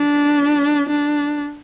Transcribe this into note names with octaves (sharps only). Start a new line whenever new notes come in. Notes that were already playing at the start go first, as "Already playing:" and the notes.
Already playing: D4
D4